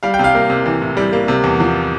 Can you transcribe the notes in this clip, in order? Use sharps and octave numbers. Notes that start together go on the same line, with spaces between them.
G3 F5
G5
C3
F5
A#3
C3
E3
A2
G3
A#3
C3
E2
F3